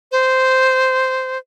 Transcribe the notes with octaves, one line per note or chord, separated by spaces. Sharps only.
C5